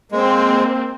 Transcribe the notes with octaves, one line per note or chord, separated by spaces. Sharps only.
G#3 A#3 C4